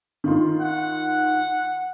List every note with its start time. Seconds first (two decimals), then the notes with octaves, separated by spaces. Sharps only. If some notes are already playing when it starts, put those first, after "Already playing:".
0.24 D#3 F4 C6
0.61 F#5